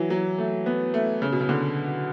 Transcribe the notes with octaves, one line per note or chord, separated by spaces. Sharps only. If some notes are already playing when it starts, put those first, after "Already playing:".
Already playing: E3 F#3
F#3
A3
B3
A3
C#3
B2
C#3
D3